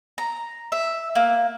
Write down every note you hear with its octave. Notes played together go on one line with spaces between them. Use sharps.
A#5
E5
A#3